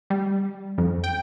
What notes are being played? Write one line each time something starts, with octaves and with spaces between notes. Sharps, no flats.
G3
F2
G5